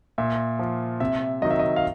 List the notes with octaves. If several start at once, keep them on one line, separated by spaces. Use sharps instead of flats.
A#2 E5
F3
C3 E5
D#3 F#3 D#5
E5
D#5
F5